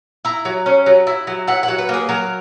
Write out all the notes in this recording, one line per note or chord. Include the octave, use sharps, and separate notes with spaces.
E4 A#5
F#3
C#4
F#3
E4
F#3
E4 F#5
F#5
F#3
B4
A#3 G#4
F#3 A#4